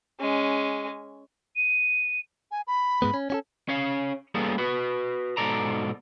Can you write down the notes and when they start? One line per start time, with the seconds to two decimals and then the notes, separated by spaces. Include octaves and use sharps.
0.20 G#3 C#4
1.56 D#7
2.51 G#5
2.67 B5
3.02 G#2 G#3 B3
3.14 C#4
3.30 C#4 F#4 A4
3.69 C#4 C#5 F5
4.35 G3 A#3 B3 C#4 G#4 A4
4.58 F#4 B4
5.37 G#2 B2 A4 D5 A#5